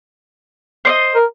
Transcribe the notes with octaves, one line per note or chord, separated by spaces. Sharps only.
C5 D5 D#5
A#4